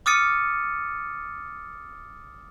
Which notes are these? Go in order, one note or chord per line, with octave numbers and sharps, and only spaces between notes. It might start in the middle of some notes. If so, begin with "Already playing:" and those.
D6 D#6 F6 A6 C#7 D#7